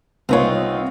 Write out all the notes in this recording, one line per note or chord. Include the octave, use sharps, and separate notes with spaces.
C2 B3 C4 D#4 F4 C#5